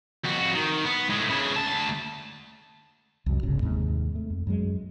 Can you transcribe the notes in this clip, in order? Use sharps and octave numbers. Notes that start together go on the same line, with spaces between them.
F2 F#4
D#3
B3
A2 G#3
C#3 E4
D2 A5
C2 F#2 F#3
D1 G1 C2 C#3
D#2 G#2 C3
A3
F2
F#2 F#3 G#3